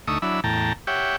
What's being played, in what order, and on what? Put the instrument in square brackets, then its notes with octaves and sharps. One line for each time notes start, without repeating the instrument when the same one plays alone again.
[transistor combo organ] D2 A3 D#4 C#6 D#6 E6
F#3 D4 E4 E5 B5
E2 A2 G5 A5 A#5
G4 C#5 E5 F#5 G5